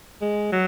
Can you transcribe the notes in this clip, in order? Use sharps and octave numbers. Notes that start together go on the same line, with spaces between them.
G#3
F#3